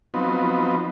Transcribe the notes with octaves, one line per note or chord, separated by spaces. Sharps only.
F3 F#3 B3 C4 D#4